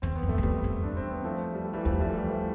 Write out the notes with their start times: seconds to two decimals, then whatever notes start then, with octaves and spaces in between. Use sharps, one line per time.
0.02 E2 C4
0.16 B3
0.23 F2
0.29 A3
0.38 E2
0.42 F2 G3 B3
0.64 E2
0.83 D4
0.97 C4
1.11 B3
1.24 F3 A3
1.54 G3
1.65 A3
1.73 E3 G3
1.85 E2 F3 A3
2.00 E3 G3
2.10 A3
2.15 E3 G3
2.30 F3 A3